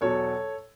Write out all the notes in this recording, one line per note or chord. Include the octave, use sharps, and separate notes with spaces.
E2 B2 F#3 A4 C#5